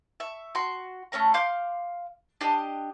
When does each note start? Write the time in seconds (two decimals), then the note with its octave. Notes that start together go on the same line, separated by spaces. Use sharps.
0.20 E5 C#6
0.55 F#4 C6
1.12 A3 C#4 C#5 A#5
1.34 F5 C6 D6 G6
2.41 D4 G4 D#5